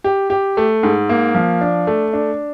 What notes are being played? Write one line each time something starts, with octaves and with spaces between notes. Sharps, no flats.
G4
G4
A3
G#2
A#3
F3
D4
A3
D4